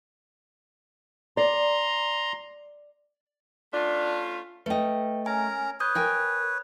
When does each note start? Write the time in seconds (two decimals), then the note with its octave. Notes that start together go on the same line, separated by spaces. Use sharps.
1.37 D5 A#5 C6
3.73 A3 C#4 D4 F4
4.66 A3 B4 D#5 G5
5.26 C#4 A#4 G#5 A#5
5.80 B4 C#5 D#6 G6
5.95 A#4 G5 G#5